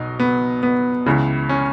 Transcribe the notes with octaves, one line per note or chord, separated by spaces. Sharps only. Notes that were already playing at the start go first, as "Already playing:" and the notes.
Already playing: B1 B2 D#4
B3
B3
C#2 C#3 E3
C#4